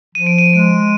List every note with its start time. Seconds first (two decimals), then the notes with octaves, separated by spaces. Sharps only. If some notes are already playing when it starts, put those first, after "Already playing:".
0.15 F3 D#7
0.27 D7
0.39 D#7
0.54 G#3 D7